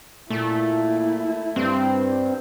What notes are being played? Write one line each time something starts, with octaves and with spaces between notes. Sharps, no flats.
A#2 A3 E4
G2 C4